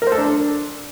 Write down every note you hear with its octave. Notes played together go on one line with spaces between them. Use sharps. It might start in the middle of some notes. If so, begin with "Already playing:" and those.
A#4
C5
A4
D4